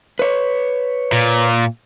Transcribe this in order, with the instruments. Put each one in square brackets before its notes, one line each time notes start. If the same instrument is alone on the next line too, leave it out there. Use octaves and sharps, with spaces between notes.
[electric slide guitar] B4 C#5
[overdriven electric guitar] A#2